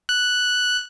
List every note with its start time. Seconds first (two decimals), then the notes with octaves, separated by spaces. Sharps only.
0.09 F#6